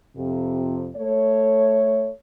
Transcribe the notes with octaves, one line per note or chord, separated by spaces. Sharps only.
F2 C3
A3 C#5